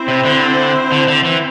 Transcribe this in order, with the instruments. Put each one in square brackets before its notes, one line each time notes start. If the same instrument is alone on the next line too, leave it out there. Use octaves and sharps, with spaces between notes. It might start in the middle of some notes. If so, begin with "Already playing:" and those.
Already playing: [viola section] C4 E4 C5
[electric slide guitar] C3
D3
D3
D3
E3